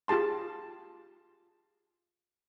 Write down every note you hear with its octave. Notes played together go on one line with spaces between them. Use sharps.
F4 G4 G#4 A5 C6